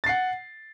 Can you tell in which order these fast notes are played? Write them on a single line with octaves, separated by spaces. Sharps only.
A6 C7 F#5